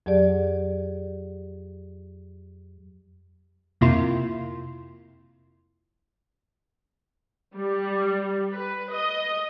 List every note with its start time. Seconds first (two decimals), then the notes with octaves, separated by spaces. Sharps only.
0.06 F2 F#3 G4 G#4 D5
3.81 F2 C3 A#3 E4 F4 C6
7.55 G3
8.52 B4
8.92 D#5